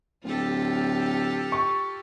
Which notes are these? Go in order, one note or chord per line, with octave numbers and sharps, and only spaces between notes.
D1 F4 G4 A4
C#6